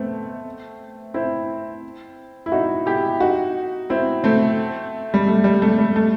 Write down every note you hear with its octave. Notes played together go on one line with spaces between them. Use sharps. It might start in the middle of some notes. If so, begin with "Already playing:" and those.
Already playing: A3 B3 C4
C4 E4
E4
D#4 F#4
E4 G4
D#4 F#4
C4 E4
A3 C4
G3
A3
G3
A3
G3
A3